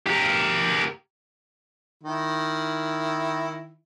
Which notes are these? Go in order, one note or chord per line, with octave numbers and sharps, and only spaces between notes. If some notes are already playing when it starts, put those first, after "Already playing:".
G4 A#4
D#3 E4